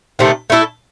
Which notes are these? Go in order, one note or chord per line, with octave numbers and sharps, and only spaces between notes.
C3 D#3 A3 C4
A3 E4 A4